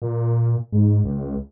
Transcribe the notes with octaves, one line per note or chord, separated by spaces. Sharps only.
A#2
G#2
C#2